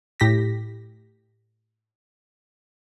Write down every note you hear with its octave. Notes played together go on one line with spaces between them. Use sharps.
A2 G4 A#6 B6